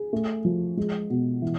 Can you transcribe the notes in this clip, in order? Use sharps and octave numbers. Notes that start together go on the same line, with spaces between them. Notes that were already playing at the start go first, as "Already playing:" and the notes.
Already playing: G#4
A3
F3
G#3
B2
E3